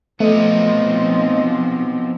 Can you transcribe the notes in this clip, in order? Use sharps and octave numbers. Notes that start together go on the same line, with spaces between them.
F3 A3 B3 C4 D#4 D#5